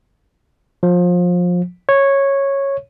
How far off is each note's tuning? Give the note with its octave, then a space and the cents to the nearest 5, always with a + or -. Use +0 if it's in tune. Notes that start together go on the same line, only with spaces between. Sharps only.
F3 +25
C#5 -10